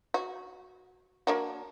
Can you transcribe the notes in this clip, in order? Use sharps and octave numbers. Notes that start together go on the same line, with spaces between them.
F#4
A#3 D4 F#4